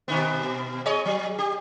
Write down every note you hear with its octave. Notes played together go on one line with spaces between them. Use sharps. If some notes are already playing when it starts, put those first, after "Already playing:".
B2 D#3 B3
B2
G#4 C#5 D#5
F#3
G4